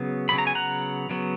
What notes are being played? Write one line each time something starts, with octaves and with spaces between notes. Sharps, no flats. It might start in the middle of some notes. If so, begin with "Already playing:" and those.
Already playing: C#3 F#3 B3
C#3 F#3 B3 B5
A#5
G#5
F#5 A#5
C#3 F#3 B3